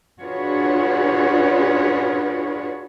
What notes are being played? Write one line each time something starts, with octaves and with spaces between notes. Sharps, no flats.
D4 F4 F#4 G#4 B4 C#5